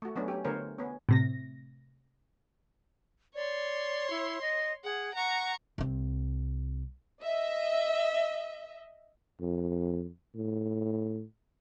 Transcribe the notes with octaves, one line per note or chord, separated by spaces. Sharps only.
A3 F#4
F#3 A3 B3 C#4 D4
C#4 G4
D3 A3 B3 A#4 C5 C#5
B3 C#4
A2 C3 A#6
C#5 D5 C6
E4
D#5
G#4 F#5
F#5 A#5 C#6
C2 C4
D#5 E5
F2
A2